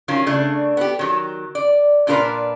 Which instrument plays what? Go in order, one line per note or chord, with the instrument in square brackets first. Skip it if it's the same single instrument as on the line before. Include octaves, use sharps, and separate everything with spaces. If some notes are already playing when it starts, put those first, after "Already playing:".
[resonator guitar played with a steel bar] D#3 F#3 C#4 F4
C#3 A3 D4
B3 G4
D#3 F#3
D5
A#2 D4 F4 A#4 B4 A#5